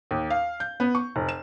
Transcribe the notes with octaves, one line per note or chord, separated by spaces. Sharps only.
D#2
F5
G6
B3
C#6
F1
E7